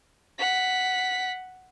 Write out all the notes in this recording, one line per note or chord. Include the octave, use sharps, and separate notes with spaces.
F#5 B6